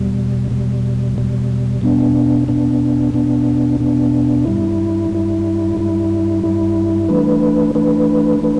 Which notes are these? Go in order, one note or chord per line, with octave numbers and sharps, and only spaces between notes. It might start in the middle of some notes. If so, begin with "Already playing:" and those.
Already playing: E2 B2 G3
E2 B2 G3
E2 B2 G3
E2 B2 B3 D4
E2 B2 B3 D4
E2 B2 B3 D4
E2 B2 B3 D4
G2 G3 E4
G2 G3 E4
G2 G3 E4
G2 G3 E4
E3 A3 D4 B4
E3 A3 D4 B4
E3 A3 D4 B4